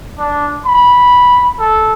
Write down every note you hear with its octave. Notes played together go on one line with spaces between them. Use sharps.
D4
B5
A4